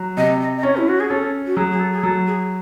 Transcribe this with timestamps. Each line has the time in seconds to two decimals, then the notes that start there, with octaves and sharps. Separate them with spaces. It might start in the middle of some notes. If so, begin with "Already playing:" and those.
Already playing: F#3
0.17 C3 D#5
0.40 D#5
0.57 D#5
0.63 C#4 C#5
0.76 E4
0.88 F#4
0.99 G#4
1.09 C#4 A4
1.46 F#4
1.56 F#3 G#4
1.71 G#4
1.79 A4
1.92 G#4
2.03 F#3 A4
2.26 G#4